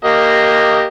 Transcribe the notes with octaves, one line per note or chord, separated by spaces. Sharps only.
A#3 G4 D#5